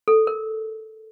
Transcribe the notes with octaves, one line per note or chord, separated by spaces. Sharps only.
A4
A#4